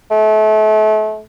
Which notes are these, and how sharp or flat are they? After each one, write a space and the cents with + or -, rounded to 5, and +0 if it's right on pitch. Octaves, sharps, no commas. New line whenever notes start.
A3 -35